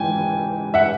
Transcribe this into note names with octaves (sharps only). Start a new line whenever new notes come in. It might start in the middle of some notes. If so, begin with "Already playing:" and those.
Already playing: G#2 E3 G5 G#5
E5 F#5